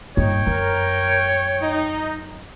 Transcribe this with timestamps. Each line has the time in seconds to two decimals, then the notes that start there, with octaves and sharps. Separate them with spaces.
0.17 G2 A#2 D#4 C#5 G5
0.47 F#2 A#4
1.62 D#4